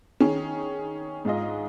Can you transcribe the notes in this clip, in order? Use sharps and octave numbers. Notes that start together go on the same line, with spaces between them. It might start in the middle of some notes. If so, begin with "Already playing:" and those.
D#3 C#4 G#4
G#2 G#3 F4 G#4 D#5